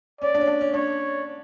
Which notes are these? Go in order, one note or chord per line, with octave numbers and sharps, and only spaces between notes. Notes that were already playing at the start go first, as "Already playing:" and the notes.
C#4 D5
D4
C#4
D4
C#4
D4 C#5